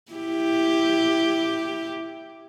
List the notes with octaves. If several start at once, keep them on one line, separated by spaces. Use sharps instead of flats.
E4 G4